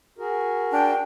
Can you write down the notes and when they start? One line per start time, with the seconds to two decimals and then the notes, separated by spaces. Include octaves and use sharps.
0.18 F#4 G#4 A#4
0.73 D4 G5